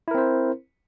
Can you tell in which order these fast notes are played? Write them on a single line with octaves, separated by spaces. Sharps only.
E4 A#4 C4 C5